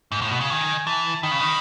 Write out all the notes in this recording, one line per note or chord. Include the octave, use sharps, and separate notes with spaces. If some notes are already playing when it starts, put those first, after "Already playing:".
G#2
A2
B2
C#3
D#3 G#5
E3 A5
D#3 B5
C#3
D#3